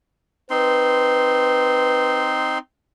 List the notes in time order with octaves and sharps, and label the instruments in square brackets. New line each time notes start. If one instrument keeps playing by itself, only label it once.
[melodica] C4 D#4 C6 [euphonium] B4